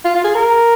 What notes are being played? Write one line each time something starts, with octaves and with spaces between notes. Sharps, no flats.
F4
F4
G#4
A#4